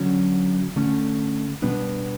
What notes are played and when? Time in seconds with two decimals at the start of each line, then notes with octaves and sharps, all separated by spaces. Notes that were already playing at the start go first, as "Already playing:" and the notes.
Already playing: D3 F#3 C#4
0.76 D3 A3 C#4
1.62 B2 G3 B3 D4